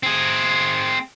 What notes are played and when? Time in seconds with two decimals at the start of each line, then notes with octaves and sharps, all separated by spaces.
0.03 C4 G#4